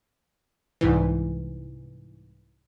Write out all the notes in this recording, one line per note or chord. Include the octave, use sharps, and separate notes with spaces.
C2 G#2 E3